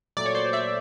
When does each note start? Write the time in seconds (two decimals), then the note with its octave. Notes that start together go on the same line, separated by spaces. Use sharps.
0.17 A#2 F#3 A3 D5
0.26 C#5
0.35 C5 D5
0.53 D5 E5